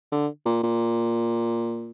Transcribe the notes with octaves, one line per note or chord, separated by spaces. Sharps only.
D3
A#2
A#2